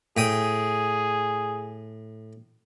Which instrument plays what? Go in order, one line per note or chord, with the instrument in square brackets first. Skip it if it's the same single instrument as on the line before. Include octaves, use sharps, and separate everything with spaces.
[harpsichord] A2 G5 D#6 [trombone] G#4